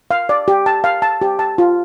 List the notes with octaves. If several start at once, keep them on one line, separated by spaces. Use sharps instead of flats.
F5
D5
G4
A5
F5
A5
G4
A5
F4